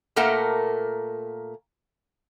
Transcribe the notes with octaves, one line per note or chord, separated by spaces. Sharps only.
A#2 A3 A#3 A#4 F#5